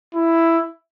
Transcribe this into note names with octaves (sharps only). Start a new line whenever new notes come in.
E4